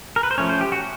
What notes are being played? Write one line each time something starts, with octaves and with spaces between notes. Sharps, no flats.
A#4
B4
C5
F3 A3 C#4 C#5
C5
G4
F#4